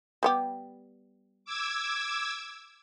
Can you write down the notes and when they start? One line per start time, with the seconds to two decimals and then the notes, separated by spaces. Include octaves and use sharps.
0.23 G3 B3 G4
1.45 D6 E6 G#6